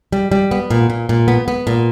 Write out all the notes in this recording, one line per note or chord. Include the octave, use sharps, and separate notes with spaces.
G3
G3
B3
A#2
A#2
A#2
B3
B3
A#2